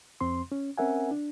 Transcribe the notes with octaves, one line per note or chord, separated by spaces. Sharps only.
F2 C4 C6
C#4
C4 C#4 A#4 E5 F#5 G#5
D4